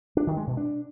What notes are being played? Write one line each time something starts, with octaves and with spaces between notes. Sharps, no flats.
D4
D#3
G#3
B2
D4